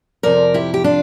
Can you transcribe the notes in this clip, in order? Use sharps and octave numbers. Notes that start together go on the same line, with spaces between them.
F2 C3 F3 A#4 D5
E4 G4
G4
D4 F4